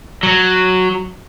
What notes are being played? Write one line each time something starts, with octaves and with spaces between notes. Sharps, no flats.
F#3